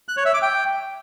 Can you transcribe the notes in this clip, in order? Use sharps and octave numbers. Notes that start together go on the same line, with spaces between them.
F#6
C#5
E5
D6
G5